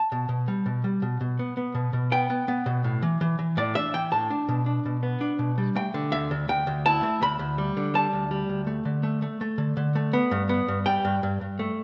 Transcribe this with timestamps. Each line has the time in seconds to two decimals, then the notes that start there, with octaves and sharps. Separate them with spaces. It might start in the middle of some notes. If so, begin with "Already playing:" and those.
Already playing: A5
0.12 B2
0.29 B2
0.48 G3
0.66 B2
0.84 G3
1.02 B2
1.21 B2
1.39 B3
1.57 B3
1.75 B2
1.93 B2
2.12 B3 G5
2.30 B3
2.48 B3
2.66 B2
2.84 A2
3.02 E3
3.21 E3
3.39 E3
3.57 A2 D5
3.75 D4 E5
3.94 E3 G5
4.12 A2 A5
4.30 D4
4.49 B2
4.66 D4
4.85 B2
5.03 B3
5.21 D4
5.39 B2
5.58 G3
5.75 A3 G5
5.94 D3
6.12 D2 E5
6.31 D2
6.48 D2 G5
6.67 D2
6.86 E4 A5
7.03 A3
7.22 D2 B5
7.39 D2
7.58 G3
7.77 D3
7.94 G3 A5
8.13 D2
8.31 G3
8.49 D2
8.67 A3
8.85 D3
9.03 A3
9.22 A3
9.41 A3
9.58 D3
9.77 D3
9.95 A3
10.13 B3
10.31 G2
10.49 B3
10.68 G2
10.86 G3 G5
11.05 G2
11.23 G2
11.41 G2
11.59 A3